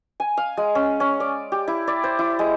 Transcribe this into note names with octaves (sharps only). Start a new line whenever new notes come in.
G#5
F5
G#3
C#4
C#4
D5
G4
E4
D5
C5
E4
G#3